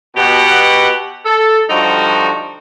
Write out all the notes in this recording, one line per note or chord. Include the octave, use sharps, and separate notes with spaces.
B2 G4 F#5
A4
D3 F3 G3 D#4 F#4